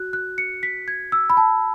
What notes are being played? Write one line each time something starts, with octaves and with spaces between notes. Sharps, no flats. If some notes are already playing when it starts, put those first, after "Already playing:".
Already playing: F#4 F#6
F#6
C#7
B6
G#6
E6
B5
A5